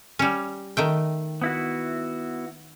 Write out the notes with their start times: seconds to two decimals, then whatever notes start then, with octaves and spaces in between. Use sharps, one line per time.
0.19 G3 C#4
0.77 D#3 A3 G5
1.42 B3 E4 F#4